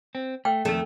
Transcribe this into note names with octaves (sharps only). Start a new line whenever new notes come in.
C4
A3 G5
F2 D#3 A3